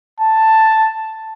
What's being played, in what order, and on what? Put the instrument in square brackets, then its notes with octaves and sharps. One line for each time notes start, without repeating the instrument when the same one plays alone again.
[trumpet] A5